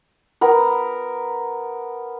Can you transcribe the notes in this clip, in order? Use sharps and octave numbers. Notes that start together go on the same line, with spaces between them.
B3 A#4